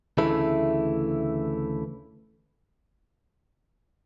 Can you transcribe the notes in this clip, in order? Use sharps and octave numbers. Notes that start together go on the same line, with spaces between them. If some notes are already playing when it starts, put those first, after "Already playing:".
D2 C#3 E3 A3 E4